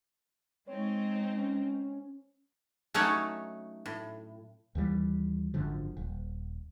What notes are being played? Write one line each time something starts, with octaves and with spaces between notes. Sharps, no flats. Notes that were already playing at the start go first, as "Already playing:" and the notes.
G#3 C4 D#4 C#5
C#4
F#3 A3 C#4 D#4 A4 C#5
A2
D#2 E3 G3
G#1 F#2 D3 F3
D#1